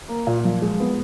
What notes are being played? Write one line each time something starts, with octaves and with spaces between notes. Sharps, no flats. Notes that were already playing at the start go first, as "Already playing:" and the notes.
A#3
A#2
F3
G#3
B3